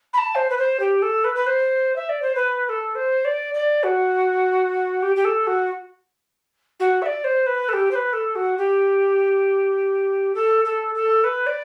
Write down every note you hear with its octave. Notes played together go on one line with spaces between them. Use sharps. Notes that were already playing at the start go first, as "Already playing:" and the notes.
B5
A5
C5
B4
C5
G4
A4
B4
B4
C5
E5
D5
C5
B4
B4
A4
C5
D5
D5
F#4
G4
G4
A4
F#4
F#4
E5
D5
C5
B4
A4
G4
C5
B4
A4
F#4
G4
A4
A4
A4
B4
D5